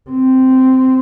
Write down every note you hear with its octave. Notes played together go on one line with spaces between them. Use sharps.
C4